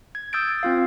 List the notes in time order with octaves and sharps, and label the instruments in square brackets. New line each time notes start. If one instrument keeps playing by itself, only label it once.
[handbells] G#6
D#6 E6 G6 A6 D7
C4 F4 F5